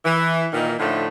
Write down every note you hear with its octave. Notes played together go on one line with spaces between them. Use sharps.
E3
A#2 D#3 E3 D#4
A2 D3 F3 A3 D#4